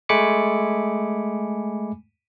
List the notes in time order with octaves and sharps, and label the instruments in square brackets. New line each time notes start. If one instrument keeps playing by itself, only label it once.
[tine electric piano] G#3 A3 G#5 B5 D6 C#7